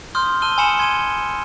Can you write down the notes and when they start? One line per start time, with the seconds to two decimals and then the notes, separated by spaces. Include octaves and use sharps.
0.15 C6 D#6 F6 G6
0.42 A5 E6 F6 D#7 G7
0.58 G#5 B5 D#6 C#7 E7
0.78 C6 G#6 D#7